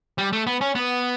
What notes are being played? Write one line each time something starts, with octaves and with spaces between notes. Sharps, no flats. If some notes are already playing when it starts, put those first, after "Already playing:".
G3
A3
B3
C#4
B3